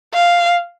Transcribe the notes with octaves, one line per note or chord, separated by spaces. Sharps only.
F5